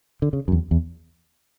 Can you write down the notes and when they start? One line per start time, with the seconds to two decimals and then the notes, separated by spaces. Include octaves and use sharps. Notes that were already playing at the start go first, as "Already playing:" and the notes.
0.22 D3
0.33 C#3
0.48 F#2
0.52 E2
0.71 E2